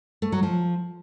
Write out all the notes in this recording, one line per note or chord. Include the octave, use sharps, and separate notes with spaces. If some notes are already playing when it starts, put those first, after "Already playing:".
A3
F#3
F3